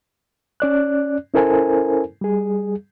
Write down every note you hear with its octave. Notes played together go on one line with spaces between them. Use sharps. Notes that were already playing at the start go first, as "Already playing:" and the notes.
C#4 D5 F#6
C#4 E4 A4 A#4 C5 G#5
G3 G#4